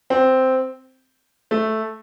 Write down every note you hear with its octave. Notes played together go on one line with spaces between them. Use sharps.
C4
A3